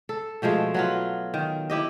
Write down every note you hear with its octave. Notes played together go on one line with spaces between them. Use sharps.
A4
B2 F3 G#3 A3
F#3 B3 F4
D#3
E4 G4 D#5